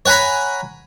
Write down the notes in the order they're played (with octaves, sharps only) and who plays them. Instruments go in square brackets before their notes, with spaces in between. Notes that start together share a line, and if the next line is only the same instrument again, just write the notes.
[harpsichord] C#5 F#5 G#5 A#5 B5